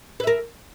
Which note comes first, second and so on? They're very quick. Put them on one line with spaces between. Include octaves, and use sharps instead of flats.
B4 E5 A#4